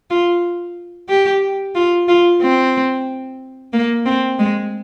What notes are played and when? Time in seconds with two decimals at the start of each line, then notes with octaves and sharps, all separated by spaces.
0.10 F4
1.09 G4
1.75 F4
2.08 F4
2.41 C4
3.73 A#3
4.05 C4
4.39 G#3